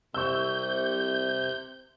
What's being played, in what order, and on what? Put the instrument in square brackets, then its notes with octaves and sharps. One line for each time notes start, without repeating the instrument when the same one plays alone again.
[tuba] C2 [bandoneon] C3 [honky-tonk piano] C#6 E6 [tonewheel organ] G6